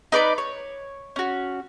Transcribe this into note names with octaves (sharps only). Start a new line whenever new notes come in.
D#4 B4 D5 D6
C#5
C#4 F#4